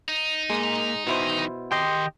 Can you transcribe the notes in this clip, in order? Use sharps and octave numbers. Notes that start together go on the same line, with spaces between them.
D#4
A#2 G#3
B2 D#3 E3 E4 C5
D#3 G4 D#5 C6